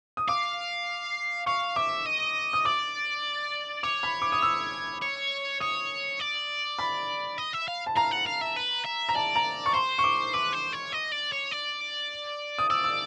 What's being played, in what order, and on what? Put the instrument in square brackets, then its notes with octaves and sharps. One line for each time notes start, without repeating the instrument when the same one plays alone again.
[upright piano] D#6
[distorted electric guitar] F5 [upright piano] D6
[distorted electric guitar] F5 [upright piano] C#6
[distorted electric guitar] E5 [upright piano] D6
[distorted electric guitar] D#5
[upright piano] D#6
[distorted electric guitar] D5 [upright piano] D6
[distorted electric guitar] C#5 [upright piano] D6
[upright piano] B5
D6
D#6
E6
[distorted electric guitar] C#5
[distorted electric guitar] C#5 [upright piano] D#6
[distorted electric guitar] D5
[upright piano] B5
[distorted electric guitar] D#5
E5
F5
[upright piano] A5
[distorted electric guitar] F5 [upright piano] A#5
[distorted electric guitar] F#5
F5
E5
B4
E5
[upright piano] A#5
[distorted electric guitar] D5 [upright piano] A5
[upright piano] A#5
C#6
[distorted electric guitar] C5 [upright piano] C6
[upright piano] C#6
D6
[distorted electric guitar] B4 [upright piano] D6
[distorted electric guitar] C5
C#5
D#5
D5
C#5
D5
[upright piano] D#6
[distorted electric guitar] D5 [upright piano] E6
[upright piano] E6